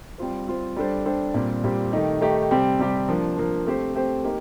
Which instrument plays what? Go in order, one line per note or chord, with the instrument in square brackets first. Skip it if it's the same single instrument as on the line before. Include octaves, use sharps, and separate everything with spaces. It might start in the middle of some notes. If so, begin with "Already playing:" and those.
[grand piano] G3 C4 F4 C5
G3 C4 F4 C5
G3 D4 A4 C5
G3 D4 A4 C5
A#2 G3 C4 G4
A#2 G3 C4 G4
D#3 A3 D#4 G4
D#3 A3 D#4 G4
C3 G3 C4 G4
C3 G3 C4 G4
F3 A#3 D4
F3 A#3 D4
A3 C4 G4 C5
A3 C4 G4 C5
A#3 D#4 G4